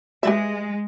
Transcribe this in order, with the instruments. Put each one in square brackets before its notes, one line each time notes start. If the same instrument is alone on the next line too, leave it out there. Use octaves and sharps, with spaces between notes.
[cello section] G#3 [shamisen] G4 B4 E5